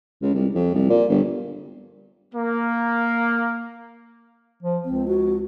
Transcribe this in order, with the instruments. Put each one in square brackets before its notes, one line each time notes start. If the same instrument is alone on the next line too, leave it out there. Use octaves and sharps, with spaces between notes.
[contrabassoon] C#2
C2
F2
C2
A#2
G1
[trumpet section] A#3
[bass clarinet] F3
[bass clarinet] C#2 [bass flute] C4
[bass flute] F#4